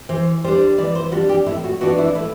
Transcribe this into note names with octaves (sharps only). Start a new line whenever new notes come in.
E3 C5
G3 D4 C5
E3 D5
C5
G3 D4 F#4
G4
A2 E4
F#4
E3 B3 D4 F#4
E4
A2 E4